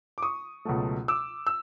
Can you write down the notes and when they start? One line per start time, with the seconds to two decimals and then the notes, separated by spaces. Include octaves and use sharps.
0.18 D6
0.22 C#6 D#6
0.65 C#2 B2 F#3 A3
1.08 D6 E6
1.47 E6